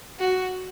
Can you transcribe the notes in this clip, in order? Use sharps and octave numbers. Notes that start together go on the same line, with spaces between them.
F#4